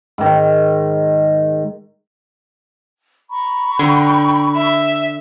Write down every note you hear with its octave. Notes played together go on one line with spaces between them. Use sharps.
G#2 D#3
A#5 B5 C#6
D3 G5
E5